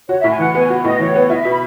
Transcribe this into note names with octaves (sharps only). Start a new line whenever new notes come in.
F#4 C#5
E5
A2
G#5
E3 F#5
B3 G#5
F#4
A2 D#5
E3 C#5
B3
E4 D#5
E5
B2
B5